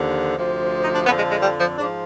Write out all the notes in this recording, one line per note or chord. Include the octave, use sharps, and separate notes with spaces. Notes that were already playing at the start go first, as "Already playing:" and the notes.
Already playing: D#2 D3 F3
D2 C3 F3
D#4
D4
F2 D3 F3 B3
G#3
G#3
G3
F3
G#2 F3 D4